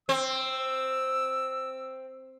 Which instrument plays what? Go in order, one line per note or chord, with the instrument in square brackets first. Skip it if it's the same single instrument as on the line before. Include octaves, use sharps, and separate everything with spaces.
[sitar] C4 [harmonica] E6